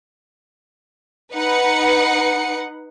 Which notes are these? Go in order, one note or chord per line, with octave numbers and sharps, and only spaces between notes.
D#4 B4 F#5 C#7